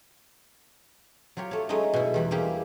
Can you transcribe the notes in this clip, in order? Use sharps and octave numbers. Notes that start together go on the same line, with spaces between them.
F#3 F4 G4 C#5
A3 C#5
F#3 G#3 A3 C#4 D#4 D#5
B2 E4
E2 G3 B5
G3 A#3 E4 G4 G#4